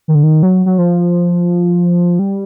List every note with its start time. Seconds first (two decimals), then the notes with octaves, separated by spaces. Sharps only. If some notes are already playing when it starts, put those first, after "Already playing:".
0.08 D#3
0.15 D3
0.23 D#3
0.43 F#3
0.66 F#3
0.78 F3
2.19 G3